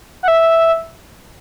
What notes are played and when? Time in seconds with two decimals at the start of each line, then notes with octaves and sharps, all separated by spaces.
0.23 F#5
0.28 E5